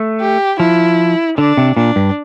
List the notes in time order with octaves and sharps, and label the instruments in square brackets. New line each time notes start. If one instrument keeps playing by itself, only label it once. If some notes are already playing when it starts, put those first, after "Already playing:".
Already playing: [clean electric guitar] A3
[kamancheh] G4
[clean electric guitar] F3 [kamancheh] E4
[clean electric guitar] D3 [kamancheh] D4
[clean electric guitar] C3
[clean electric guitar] A#2 [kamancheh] D4
[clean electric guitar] G2